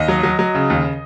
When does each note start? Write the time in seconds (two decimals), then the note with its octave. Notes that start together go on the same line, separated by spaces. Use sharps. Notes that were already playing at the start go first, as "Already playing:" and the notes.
Already playing: D#2 D#5
0.08 F#3
0.23 F#3
0.39 F#3
0.55 C#3
0.70 D#2